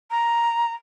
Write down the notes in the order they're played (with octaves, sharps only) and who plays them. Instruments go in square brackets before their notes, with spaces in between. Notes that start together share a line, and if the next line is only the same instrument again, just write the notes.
[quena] A#5